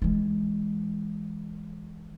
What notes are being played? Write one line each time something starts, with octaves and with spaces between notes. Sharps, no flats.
E3 G#3